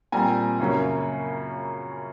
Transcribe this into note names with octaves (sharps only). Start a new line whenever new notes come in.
A#2 G3 C4 G#5 A#5
F#2 C#3 F#3 A#3 C#4